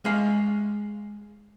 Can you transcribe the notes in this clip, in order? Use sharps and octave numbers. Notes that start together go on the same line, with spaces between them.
G#3 F5